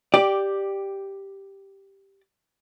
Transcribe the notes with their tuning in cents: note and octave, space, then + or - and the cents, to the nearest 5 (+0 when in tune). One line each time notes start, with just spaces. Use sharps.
G4 +0 D5 +10